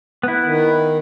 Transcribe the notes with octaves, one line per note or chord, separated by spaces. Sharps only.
B3 E4
D#3